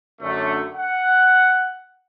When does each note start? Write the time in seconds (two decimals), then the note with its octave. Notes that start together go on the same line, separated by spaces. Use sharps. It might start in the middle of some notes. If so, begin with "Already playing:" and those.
0.22 F#2 D3 A3
0.75 F#5